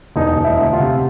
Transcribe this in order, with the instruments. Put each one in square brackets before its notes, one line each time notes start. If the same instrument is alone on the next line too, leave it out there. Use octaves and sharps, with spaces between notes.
[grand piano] E1 D#4
E1
E4
D2
F4
C3